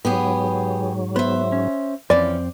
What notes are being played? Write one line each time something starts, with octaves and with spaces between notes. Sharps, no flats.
G#2 F#3 B3 G4 G#4
B3 B4 C5 E5
C#4
F2 E3 C4 C#4 D5